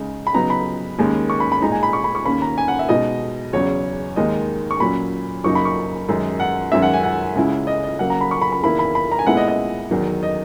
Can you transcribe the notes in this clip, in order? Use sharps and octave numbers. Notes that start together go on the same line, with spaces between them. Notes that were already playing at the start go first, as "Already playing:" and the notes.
Already playing: C#3 G#3 D#4
B5
C#3 F#3 B3 D#4 A#5
B5
D#2 D#3 G#3 C#4
C#6
B5
B5
A#2 G#3 D#4 A#5
G#5
B5
C#6
B5
C#6
D#2 D#3 A#3 C#4 B5
A#5
G#5
F#5
E5
B2 G#3 D#4 D#5
E2 C#3 F#3 C#5
D#2 D#3 G#3 D#5
C#6
A#2 F#3 C#4 B5
F#2 C#3 F#3 A#3 D#4 C#6
B5
C#6
F#2 D#3 G#3 D#4
F#5
F#2 D#3 G#3 C#4 E5
F#5
G#5
F#5
C#2 C#3 G#3 C#4 E4
D#5
D#5
C#3 F#3 A#3 F#5
A#5
B5
C#6
B5
B5
E2 D#3 A#3 E4 B5
B5
B5
A#5
G#5
A#2 G#3 B3 E4 F#5
D#5
D#5
E2 D#3 F#3
D#5